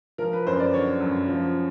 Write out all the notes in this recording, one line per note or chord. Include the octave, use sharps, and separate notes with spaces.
F3 A#4
B4
F#2 C5
D5
D3 C#5
F#2
F3